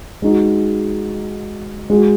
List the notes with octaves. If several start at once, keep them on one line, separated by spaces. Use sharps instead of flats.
G#3 D#4 F#4
G#3 F#4